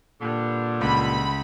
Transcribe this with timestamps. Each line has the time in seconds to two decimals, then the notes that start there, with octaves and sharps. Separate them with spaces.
0.21 G2 A#2 D3
0.81 C#2 B5